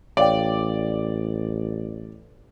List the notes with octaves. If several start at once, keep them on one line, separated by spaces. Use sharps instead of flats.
A1 C#5 D5 F5 G5